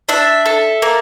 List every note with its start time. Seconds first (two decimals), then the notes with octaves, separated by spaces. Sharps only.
0.09 D4 E5
0.46 A4
0.82 A#3